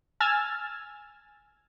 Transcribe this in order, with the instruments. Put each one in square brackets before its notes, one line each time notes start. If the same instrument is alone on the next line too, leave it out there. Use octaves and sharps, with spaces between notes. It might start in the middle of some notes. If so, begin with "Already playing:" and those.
[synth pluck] G#5 E6 F6 G#6 A6